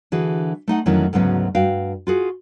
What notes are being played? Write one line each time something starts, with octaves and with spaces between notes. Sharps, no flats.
D3 E3 F#4 G#4
A3 D#4 F#5
F2 D#3 E3 F#3 C#4 E4
D2 G#2 C#3 F#3 B3 C#4
G2 F#4 F5 G5
F4 F#4 G#4